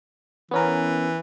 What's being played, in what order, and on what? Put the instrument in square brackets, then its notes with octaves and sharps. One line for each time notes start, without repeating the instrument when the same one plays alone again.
[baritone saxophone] E3 [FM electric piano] B3 C#4 A#4